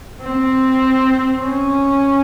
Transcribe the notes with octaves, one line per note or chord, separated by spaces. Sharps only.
C4
C#4